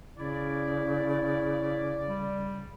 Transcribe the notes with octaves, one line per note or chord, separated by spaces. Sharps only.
C#3 E4 D5
G3